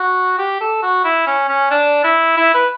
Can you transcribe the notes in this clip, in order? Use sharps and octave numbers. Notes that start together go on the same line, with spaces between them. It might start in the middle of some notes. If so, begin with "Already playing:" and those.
Already playing: F#4
G4
A4
F#4
E4
C#4
C#4
D4
E4
E4
B4